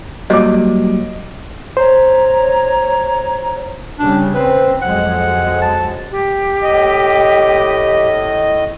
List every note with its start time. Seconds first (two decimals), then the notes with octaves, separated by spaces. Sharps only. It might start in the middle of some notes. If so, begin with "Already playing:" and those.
0.30 F#3 G3 A#3 D#5 D6
1.77 C5 C#5 A#5
3.99 C#3 G3 D4
4.34 C4 B4
4.82 F2 F#3 G#3 F#5
5.62 A5
6.11 G4
6.63 A2 D#5